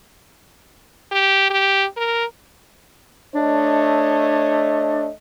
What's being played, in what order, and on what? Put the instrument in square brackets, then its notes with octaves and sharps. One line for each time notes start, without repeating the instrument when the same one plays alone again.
[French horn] G4
G4
A#4
[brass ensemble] A3 C#5 D#5 [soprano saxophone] D4